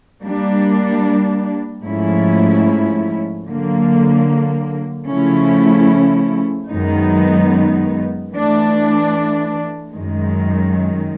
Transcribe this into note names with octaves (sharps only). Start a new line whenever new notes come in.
G3 A#3 D4
G#2 F3 A3 C#4 E4
D3 F#3 A#3
C#3 F3 A3 C#4 E4
F#2 D#3 G#3 B3 D#4
E3 A3 D4
F#2 D#3 G#3